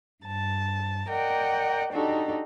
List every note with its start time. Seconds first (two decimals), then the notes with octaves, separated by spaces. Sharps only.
0.24 G2 A5
1.09 A#4 D5 D#5 F#5 G5
1.92 D4 D#4 F#4 G4 A4